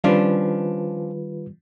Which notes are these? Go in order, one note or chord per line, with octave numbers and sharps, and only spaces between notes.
D#3 F3 G3 C#4 D4 F4 B4